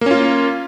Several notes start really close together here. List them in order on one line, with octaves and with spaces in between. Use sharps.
A#3 C#4 F4